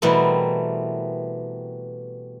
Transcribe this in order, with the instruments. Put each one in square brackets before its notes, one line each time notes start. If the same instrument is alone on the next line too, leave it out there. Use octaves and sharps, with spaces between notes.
[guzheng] B2 E3 G3 A3 C4 A#4